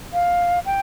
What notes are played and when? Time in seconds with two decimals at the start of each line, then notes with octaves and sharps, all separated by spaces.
0.13 F5
0.66 G5